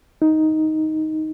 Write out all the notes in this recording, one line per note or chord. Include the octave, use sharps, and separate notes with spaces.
D#4